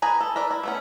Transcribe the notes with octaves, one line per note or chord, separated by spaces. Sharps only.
G#4 B4 G#5 A#5
A4
A#4 B4 D5
E4
A3 B3 C#4